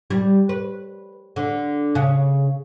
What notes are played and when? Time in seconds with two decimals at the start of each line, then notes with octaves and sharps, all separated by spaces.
0.10 G3
0.49 B4
1.36 D3
1.95 C#3